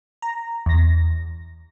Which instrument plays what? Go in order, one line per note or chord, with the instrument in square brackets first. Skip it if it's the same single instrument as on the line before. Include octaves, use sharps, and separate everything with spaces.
[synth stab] A#5
E2 A#6